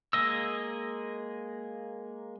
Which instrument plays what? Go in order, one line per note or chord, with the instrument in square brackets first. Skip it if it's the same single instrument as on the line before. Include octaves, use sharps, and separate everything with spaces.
[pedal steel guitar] G#3 A#3 D#5 E6